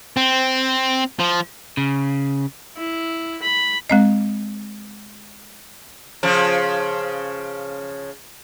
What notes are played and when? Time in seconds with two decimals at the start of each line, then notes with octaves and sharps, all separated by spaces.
0.17 C4
1.20 F3
1.77 C#3
2.77 E4
3.43 B5
3.90 G#3 C4 D#5
6.23 C#3 F3